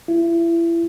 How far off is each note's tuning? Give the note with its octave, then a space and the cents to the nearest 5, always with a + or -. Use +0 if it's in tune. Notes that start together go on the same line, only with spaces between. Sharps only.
E4 +30